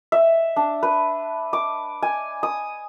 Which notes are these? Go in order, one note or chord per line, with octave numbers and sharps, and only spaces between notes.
E5
D4
B4
D6
G#5
D#6